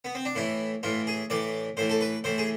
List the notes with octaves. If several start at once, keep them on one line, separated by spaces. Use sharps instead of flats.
B3
C4
D4
A2 E3 E4
A2 E3 F4
G#4
A2 E3 D5
A2 E3 C5
A4
B4
A2 E3 C5
G#4